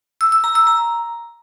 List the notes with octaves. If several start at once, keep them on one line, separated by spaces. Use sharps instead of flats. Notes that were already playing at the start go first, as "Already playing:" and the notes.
E6
E6
A#5
E6
A#5